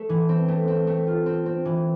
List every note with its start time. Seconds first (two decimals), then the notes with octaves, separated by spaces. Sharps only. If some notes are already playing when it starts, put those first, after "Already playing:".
Already playing: A3
0.09 E3
0.29 C4
0.48 A3
0.68 C4
0.87 A3
1.07 F4
1.26 C4
1.46 C4
1.65 E3